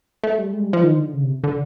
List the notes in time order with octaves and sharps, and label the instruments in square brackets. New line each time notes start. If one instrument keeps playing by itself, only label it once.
[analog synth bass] A3
G3
G#3
G3
F3
D#3
D3
C#3
C3
D3